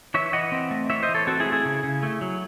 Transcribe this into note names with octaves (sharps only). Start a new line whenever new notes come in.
E3 C#5 E5
E3 D#5 F#5
C4
A3
E3 C#5 E5
C5 D#5
E3
A4 C#5
C4 F#4 A4
E4 G#4
A3
E4 G#4
C#3
C#3
A3
F#3